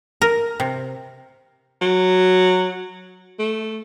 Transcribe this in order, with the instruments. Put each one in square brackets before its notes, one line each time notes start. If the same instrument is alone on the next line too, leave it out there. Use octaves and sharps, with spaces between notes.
[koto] A#4
C3
[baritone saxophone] F#3
A3